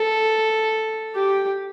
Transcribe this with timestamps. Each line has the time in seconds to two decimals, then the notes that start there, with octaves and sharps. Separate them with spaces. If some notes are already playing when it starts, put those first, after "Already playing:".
Already playing: A4
1.15 G4